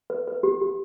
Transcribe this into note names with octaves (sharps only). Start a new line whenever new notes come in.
B4
B4
G4
G4